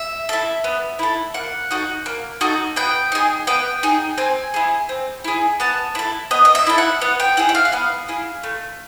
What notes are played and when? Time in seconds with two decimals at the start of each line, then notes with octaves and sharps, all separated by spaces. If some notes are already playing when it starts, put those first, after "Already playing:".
Already playing: E5
0.29 E4 A4
0.64 B3
0.99 E4 A4
1.34 A#3 F#5
1.71 D#4 F#4 A4
2.06 A#3
2.41 D#4 F#4 A4
2.76 B3 G5
3.12 D#4 G#4
3.47 B3 G5
3.83 D#4 G#4
4.18 C4 G#5
4.54 E4 G#4
4.89 C4
5.24 E4 G#4
5.60 B3 A5
5.95 E4 A4
6.31 B3 D#5
6.45 D#5
6.55 E5
6.67 E4 A4
6.78 F#5
7.01 B3
7.20 G5
7.37 E4 G#4 F#5
7.49 E5
7.55 F5
7.65 F#5
7.72 B3 F5
8.09 E4 G#4
8.43 A3